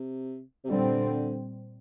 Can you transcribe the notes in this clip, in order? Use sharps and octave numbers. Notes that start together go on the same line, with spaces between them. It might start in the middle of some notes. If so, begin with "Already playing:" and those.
Already playing: C3
C3
A#2 D3 G3 C4